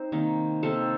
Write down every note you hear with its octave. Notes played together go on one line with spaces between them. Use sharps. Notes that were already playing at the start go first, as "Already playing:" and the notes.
Already playing: C4 D#4 C5
C3 D#3 A#3
C3 D#3 A#3 A4 C5